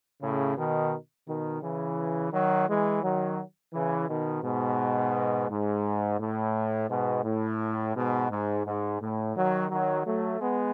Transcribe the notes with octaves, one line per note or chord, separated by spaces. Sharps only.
A2 C#3
B2 D#3
B2 D#3
C#3 E3
D#3 F#3
E3 G#3
D#3 F#3
C#3 E3
B2 D#3
G#2 B2
G#2
A2
G#2 B2
A2
G#2 B2
G#2
G#2
A2
D#3 F#3
D#3 F#3
F#3 A3
G#3 B3